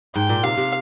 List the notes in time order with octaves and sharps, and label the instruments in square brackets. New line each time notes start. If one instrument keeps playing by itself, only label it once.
[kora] G#2 [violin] G5
[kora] A#2
[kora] C3 [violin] F5
[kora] C3